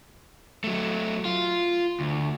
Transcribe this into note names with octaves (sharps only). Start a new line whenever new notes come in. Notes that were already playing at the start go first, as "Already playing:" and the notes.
F#3 A3
F4
D2